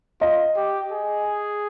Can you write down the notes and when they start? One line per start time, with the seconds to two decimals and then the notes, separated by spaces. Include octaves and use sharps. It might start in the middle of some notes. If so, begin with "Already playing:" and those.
0.21 F4 D#5
0.56 G4
0.92 G#4